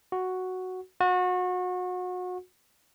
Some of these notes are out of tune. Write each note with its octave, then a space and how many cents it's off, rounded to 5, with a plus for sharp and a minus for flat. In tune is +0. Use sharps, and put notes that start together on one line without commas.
F#4 +0
F#4 -30